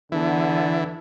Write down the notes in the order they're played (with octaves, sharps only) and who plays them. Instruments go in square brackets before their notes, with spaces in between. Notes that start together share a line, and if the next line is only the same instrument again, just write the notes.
[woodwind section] E2 B3 D4 [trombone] D3 [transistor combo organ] E3